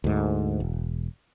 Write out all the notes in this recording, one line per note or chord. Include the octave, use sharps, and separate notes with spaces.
D2 G#2
E1